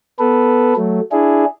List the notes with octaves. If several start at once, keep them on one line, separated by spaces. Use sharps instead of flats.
B3 A4 B4
F#3 A3
D4 E4 G#4